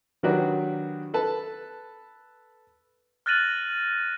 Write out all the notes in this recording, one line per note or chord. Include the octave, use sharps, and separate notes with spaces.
D#3 F#3 D4 F#4 G4 B4
A4 B4 A5
F6 F#6 A6 A#6 D#7 F#7